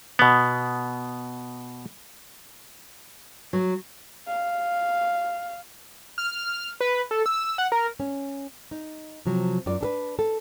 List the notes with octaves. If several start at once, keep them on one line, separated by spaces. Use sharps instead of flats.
B2 B3
F#3
F5
F6
B4
A4
E6
F#5
A#4
C#4
D#4
C3 F3 F#3
F#2 F4 D5
D4 A4 B4
A4